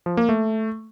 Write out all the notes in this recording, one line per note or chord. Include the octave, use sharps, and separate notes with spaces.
F3
A#3
A3